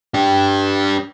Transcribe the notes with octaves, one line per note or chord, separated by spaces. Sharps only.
D4 G4